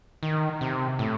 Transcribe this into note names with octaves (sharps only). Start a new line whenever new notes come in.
D#3
C3
A2